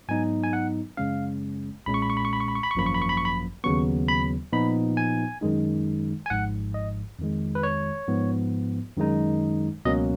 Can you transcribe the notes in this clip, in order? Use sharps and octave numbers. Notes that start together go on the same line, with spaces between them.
G#2 F#3 B3 D#4 G#5
G#5
F#5
F#2 C#3 G#3 C#4 F5
B1 A#2 G#3 C#4 B5
C#6
B5
C#6
B5
C#6
B5
C#6
B5
C#6
B5
C#6
G#1 F#2 F3 A#3 B5
C#6
B5
C#6
B5
C#6
B5
D#2 C#3 F#3 B3 C#6
B5
A#2 F3 B3 D#4 B5
G#5
F#2 D#3 G#3 D#4
G#5
G#1 G#2 F3 F#5
D#5
F2 D#3 G#3
B4
C#5
G#2 F3 B3
F#2 D#3 G#3 D#4
C#2 B2 F#3 A#3 C#4 D#5